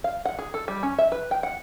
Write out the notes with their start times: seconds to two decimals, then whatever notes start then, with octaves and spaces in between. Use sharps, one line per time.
0.04 F5
0.25 F#5
0.39 G#4
0.54 A4
0.68 G3
0.83 C#4
0.98 E5
1.12 B4
1.31 G5
1.43 F#5